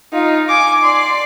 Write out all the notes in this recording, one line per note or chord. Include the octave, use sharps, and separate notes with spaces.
D#4 F4
G#5 D6
D5 C6